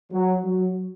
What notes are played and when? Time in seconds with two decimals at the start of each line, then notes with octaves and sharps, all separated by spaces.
0.12 F#3
0.43 F#3